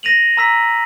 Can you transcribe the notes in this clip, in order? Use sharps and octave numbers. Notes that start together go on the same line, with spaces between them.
A#6 D#7 F7 F#7
A#5 E6 B6